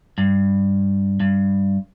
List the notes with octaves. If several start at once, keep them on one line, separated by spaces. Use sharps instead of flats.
G2
G2